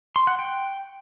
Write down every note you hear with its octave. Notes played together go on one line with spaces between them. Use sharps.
C6
F#5
G5